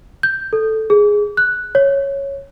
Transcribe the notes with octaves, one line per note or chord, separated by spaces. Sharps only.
G6
A4
G#4
F#6
C#5